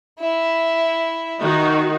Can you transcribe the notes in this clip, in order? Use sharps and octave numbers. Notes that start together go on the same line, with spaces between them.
E4 E5
D#3 D#4 F#4